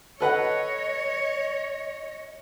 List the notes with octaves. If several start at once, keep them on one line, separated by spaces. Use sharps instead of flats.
A4 B4 C#5 D#5 F#5